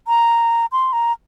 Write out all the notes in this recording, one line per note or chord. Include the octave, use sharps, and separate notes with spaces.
A#5
C6
A#5